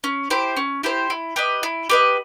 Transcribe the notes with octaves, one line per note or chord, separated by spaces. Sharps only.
C#4
E4 G4 C5
C#4
E4 G4 C5
E4
G4 B4 D#5
E4
G4 B4 D#5